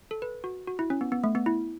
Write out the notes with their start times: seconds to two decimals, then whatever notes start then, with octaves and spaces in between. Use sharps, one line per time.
0.11 A4
0.22 B4
0.44 F#4
0.67 F#4
0.79 E4
0.90 C#4
1.01 B3
1.12 B3
1.24 A3
1.35 B3
1.46 E4